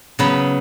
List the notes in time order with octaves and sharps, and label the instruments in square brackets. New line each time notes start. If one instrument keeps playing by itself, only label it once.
[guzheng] C#3 F#3 B3 B4